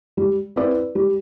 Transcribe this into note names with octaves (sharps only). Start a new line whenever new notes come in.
G3
C4 E4 B4 D5
G3